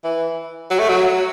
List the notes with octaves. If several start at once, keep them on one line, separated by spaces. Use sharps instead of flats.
E3
F#3
A3
F#3